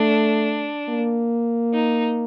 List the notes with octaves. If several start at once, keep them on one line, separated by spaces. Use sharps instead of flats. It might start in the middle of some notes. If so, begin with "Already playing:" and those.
Already playing: A3 D4
A#3
D#4